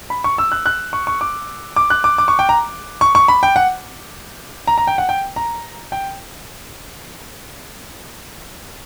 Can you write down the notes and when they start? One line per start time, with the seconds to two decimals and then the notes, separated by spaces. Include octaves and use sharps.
0.10 B5
0.24 C#6
0.38 E6
0.52 F#6
0.66 F#6
0.93 C#6
1.07 C#6
1.21 D6
1.76 D6
1.90 F#6
2.04 D6
2.18 D6
2.28 C#6
2.39 G5
2.49 A#5
3.01 C#6
3.15 C#6
3.28 B5
3.43 G5
3.56 F#5
4.67 A#5
4.78 A#5
4.87 G5
4.98 F#5
5.09 G5
5.36 A#5
5.92 G5